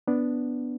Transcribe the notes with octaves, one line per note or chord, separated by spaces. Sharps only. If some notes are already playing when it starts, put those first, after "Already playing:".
B3 D4